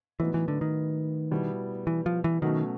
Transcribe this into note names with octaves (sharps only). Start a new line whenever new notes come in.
A2 E3 F#3 B3 D#4
E3
D3
D#3
B2 G3 B3 E4
E3
F3
E3
B2 D#3 F#3 A3 C#4